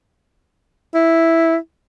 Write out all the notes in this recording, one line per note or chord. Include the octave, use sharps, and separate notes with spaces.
E4